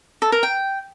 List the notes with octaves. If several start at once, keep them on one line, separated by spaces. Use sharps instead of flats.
A4
A#4
G5